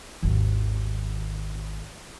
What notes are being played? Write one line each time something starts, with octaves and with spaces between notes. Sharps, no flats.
G#1 D#2